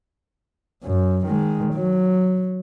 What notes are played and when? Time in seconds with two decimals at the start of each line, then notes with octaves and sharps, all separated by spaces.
0.84 F#2
1.26 D#3 G#3
1.74 F#3